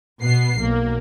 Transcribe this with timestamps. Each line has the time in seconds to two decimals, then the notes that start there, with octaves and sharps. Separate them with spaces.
0.22 B2 B3 C7
0.58 B1 A#3